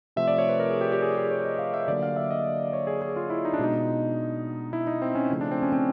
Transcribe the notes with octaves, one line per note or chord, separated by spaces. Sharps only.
C3 F3 A3 E5
D5
C#5
B4
A#4
G#4
G4
G4
G#4
G#4
C#5
D#5
F5
E5
D3 F#3 A#3 D5
F5
E5
D#5
C#5
G#4
G#4
F4
E4
D#4
D4
B2 G#3 D#4
E4
D#4
C4
C#4
C#3 F3 A3
D4
C4
C#4
C4